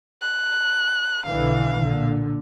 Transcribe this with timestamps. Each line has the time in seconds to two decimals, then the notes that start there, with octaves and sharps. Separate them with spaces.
0.22 F#6
1.26 B1 D3 E3 F5
1.80 A#2 D3